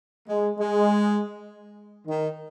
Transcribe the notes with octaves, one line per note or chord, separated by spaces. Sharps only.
G#3
G#3
D#3